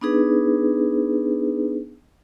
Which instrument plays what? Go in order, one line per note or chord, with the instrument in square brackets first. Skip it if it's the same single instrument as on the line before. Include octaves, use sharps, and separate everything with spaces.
[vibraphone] B3 D4 D#4 G#4 B4